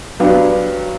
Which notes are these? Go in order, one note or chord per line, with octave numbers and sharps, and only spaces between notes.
G2 F#3 B3 D4 G4